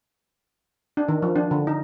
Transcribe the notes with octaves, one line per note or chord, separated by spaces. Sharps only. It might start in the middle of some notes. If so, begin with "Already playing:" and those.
D4
D#3
F3
D4
D3
D#4